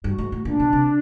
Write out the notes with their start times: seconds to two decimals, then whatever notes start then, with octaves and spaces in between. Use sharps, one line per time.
0.04 G2 F#4
0.18 G#2
0.32 A2
0.45 A#2 D4
0.60 B2
0.73 C3